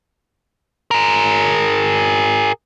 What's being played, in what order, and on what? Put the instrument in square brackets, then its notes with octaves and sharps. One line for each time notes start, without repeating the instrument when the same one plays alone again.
[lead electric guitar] G#4 A#4